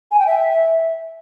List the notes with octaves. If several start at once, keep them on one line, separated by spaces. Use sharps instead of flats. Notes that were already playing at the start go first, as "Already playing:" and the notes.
G#5
G5
E5